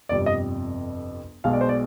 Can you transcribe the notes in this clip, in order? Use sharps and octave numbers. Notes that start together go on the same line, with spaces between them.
G1 F2 C3 G3 D5
D#5
B1 B2 G#3 F5
D5
C5
D5